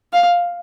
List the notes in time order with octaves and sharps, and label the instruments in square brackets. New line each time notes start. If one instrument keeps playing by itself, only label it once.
[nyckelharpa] F5